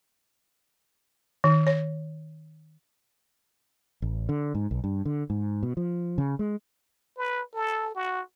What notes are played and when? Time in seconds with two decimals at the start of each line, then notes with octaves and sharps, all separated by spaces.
1.44 D#3
1.67 C#5
4.02 A1
4.29 D3
4.55 G#2
4.71 B1
4.84 G2
5.06 D3
5.30 G#2
5.63 B2
5.77 F3
6.18 C#3
6.39 G#3
7.17 B4
7.54 A4
7.95 F#4